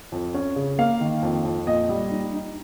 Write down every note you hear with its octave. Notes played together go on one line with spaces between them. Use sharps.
F2
C#4
C#3
A#3 F5
D#3
F2
F2
A#2 D#5
G3
D#4
D#4